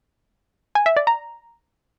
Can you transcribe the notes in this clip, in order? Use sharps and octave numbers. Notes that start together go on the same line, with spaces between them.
G#5
E5
D5
A#5